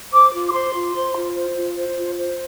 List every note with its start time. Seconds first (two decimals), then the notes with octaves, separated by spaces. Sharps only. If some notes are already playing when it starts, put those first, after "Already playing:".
0.12 C5 D6
0.33 F4
0.49 D6
0.53 C5 C6
0.74 F4
0.95 C5
1.15 F4
1.35 C5
1.55 F4
1.77 C5
1.97 F4
2.17 C5